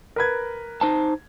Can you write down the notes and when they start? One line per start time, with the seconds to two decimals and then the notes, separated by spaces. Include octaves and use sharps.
0.16 A#4 B4 G#6
0.81 D#4 C5 A5